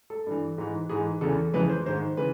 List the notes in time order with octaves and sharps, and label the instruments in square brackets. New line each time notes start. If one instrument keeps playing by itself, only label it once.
[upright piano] A4
G2 E3
G#2 E3
G#2 E3 G#4
E2 C#3 E3 A4
F2 C#3 E3 B4
C5
G#2 D#3 C5
C#3 E3 B4